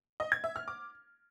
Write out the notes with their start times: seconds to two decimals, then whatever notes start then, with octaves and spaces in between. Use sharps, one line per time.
0.20 D#5
0.32 G#6
0.44 E5
0.56 F6
0.68 D6